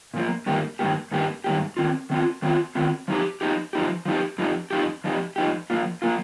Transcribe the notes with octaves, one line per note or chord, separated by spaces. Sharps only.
A#2 F3 A#3
G2 D#3 A#3 G4
G2 D#3 A#3 G4
G2 D#3 A#3 G4
G2 D#3 A#3 G4
D#3 C4 F4
D#3 C4 F4
D#3 C4 F4
D#3 C4 F4
F3 D#4 G4
F3 D#4 G4
F3 D#4 G4
F3 D#4 G4
F2 F3 D#4 G4
F2 F3 D#4 G4
F2 F3 D#4 G4
F2 F3 D#4 G4
F3 A#3 F4
F3 A#3 F4